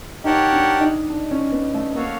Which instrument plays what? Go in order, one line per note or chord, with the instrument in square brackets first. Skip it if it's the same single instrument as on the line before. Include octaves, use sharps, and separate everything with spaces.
[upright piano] D#4 [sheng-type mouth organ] G4 A#4 C#5 F#5 A5
[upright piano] D4
D#4
D4
C#4
B3
A3
[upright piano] A#3 [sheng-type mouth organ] F#4 A4 C#5 F5